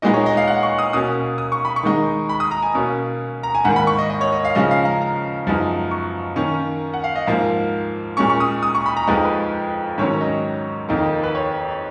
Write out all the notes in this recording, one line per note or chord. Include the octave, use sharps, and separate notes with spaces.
A#2 G#3 B3 D#4 D#5
C#5
D#5
F5
F#5
C#6
D#6
B2 A#3 C#4 D#6
D#6
C#6
B5
C#6
D#3 G#3 D#4
B5
D#6
A#5
G#5
B2 A#3 C#4
A#5
G#5
G#2 D#3 A#3 F#5
B5
C#6
D#5
D#5
C#5
D#5
F5
C#3 F3 G#3 C#4 D#5
F5
A#5
A#5
F#2 F3 G#3 B3 D#4
C#6
D#3 A#3 C#4
F#5
F5
D#5
G#2 F3 A#3 F5
A#2 G#3 C#4 C#6
C#6
D#6
D#6
C#6
B5
A#5
F2 F3 G#3 D#4 B4
B4
G#2 D#3 F#3 C#4 C#5
D#5
F2 D#3 A#3 D#4
B4
C#5